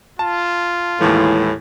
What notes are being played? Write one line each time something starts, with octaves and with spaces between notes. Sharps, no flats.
F4 A5
D#2 A2 E3 G#3 E4 G#4